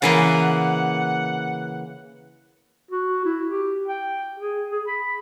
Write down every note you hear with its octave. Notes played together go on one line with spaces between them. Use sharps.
C#3 E3 A#3 F#5
F#4
E4
G4
G5
G#4
G#4
B5